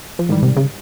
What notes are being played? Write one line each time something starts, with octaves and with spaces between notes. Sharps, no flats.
F3
G#2 D#3 E3 G3
C3
C#3